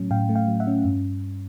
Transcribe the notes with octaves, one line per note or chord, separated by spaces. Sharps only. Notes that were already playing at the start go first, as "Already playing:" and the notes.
Already playing: A2 F#3 A3 C#4
A2 F5 G5
A3
F5 G5
F#3
E5 F#5
C#4
G2